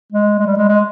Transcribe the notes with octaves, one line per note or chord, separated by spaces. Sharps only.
G#3
G#3
G3
G#3
G#3